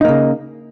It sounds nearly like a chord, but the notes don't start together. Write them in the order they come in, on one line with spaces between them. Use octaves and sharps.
D#4 A#3 C#3